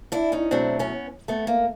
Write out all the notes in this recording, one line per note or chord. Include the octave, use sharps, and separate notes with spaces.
D4 E4
C#4 D#4
B2 F#3 A3 C4 D4
B3 C#4
A3 B3
A#3